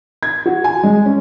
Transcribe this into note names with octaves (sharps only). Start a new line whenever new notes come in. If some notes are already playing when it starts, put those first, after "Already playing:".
G#6
F#4
G#5
G#3
C#4